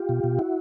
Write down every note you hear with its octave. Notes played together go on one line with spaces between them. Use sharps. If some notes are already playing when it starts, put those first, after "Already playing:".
Already playing: F4 G4
B2
B2
E4 F#4